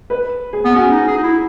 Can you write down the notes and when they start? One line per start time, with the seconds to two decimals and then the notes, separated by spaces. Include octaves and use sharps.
0.10 B4
0.53 G#4
0.65 B3
0.75 C#4 F#4
0.91 D#4
1.07 G#4
1.17 D#4
1.23 E4